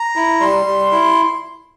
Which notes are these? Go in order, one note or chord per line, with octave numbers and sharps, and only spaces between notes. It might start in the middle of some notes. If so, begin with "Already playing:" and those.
Already playing: A#5
E4
G3 C6
G3
E4